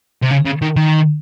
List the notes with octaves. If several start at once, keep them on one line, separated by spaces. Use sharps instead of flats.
C3
C#3
C#3
D#3
D#3